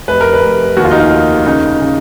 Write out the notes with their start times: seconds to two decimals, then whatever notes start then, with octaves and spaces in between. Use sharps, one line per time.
0.08 F1 B4
0.21 A#4
0.33 B4
0.42 F1
0.77 D#2 F#4
0.85 F4
0.91 D#4
0.99 F4
1.12 D#3
1.46 C#3 D#4
1.81 C#3